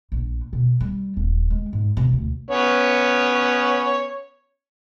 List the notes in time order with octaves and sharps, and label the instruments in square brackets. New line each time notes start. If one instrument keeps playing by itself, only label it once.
[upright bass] A#1
B2
G3
D#1
G#3
G#2
C3
D2
[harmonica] B3 C#4 C#5